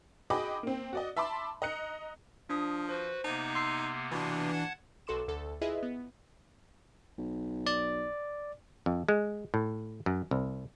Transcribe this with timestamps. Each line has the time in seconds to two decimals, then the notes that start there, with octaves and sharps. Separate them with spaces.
0.30 F#4 G#4 D#5 G5 B5 D6
0.63 A#3 C4
0.93 F#4 D5 D#5
1.17 E5 A5 B5 C6 D6
1.62 D#5 A#5 F#6 C#7
2.50 F3 D4 D#6
2.89 F#4 B4 C5
3.24 C3 A#3 B3 D#4 A5
3.55 C6 E6 C7
4.11 B2 E3 D4
4.52 F#5 A5 G#6
5.07 B1 F#4 A4 C6 D6 E7
5.28 D2 A4
5.62 E4 F4 G#4 B4 D#5 E5
5.83 B3
7.18 B1
7.67 D5
8.86 F2
9.09 G#3
9.54 A2
10.06 F#2
10.31 C2